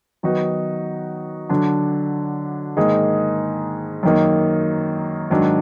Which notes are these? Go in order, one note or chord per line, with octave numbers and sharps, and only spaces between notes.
D#3 F#3 B3 D#4 F#4
D3 F#3 D4
G#2 D#3 A#3 D#4 G#4
F#2 D#3 A#3 D#4
G#2 D#3 F#3 D4